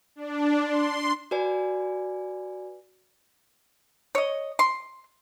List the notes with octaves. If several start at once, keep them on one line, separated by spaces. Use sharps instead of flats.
D4
C6
F#4 B4 D5 G#5
C#5 D#5
C6